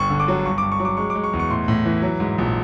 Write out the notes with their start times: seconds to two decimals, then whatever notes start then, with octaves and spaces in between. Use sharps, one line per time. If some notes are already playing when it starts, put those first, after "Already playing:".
Already playing: G1 C#6
0.10 D3
0.20 D6
0.28 F#3
0.45 G2 C#6
0.58 G2 D6
0.72 C#6
0.80 F#3
0.85 D6
0.97 G#3 C#6
1.10 D6
1.15 G#3
1.24 C#6
1.33 E2
1.39 C#6
1.50 A2 C6
1.68 A2
1.86 E3
2.02 F#3
2.20 G#2
2.38 A#1